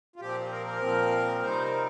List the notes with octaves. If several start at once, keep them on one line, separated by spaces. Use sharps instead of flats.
F4
A#2 F3 C4 G4
A#4
A#4
A#2 F3 C4
C3 G3 C4 D#4 C5
A#4